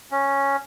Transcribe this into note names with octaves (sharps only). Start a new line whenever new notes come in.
C#4